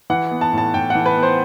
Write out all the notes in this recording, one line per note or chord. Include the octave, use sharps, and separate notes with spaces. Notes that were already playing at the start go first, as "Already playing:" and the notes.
E3 F#5
B3
A5
A2 A5
A2 G5
F#5
E3
B4
B3
C5